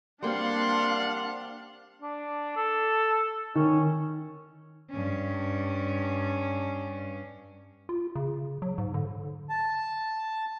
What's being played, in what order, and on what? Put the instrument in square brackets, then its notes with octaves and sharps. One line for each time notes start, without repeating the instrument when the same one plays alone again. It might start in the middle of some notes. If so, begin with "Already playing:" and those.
[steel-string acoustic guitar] G3 A#3 C4 [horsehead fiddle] D4 F5 [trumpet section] D5 F#5 [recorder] C6
[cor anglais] D4
A4
[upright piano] D#3 [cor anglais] C#4
[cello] G2 C#4
[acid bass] F4
C#3
F#3
G#2
D3
[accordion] A5